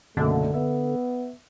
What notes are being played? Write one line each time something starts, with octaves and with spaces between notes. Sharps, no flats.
F#1 B1 D3 A3
B3 E5